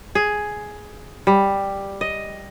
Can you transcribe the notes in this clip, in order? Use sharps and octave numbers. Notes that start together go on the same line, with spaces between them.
G#4
G3
D#5